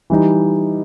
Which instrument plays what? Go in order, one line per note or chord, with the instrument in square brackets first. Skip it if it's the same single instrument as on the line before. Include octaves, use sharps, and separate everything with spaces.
[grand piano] E3 G3 D#4